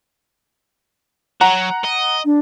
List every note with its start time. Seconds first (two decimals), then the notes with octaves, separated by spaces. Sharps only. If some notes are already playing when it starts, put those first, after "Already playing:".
1.41 F#3 F#5 A#5
1.85 D#5
2.25 D4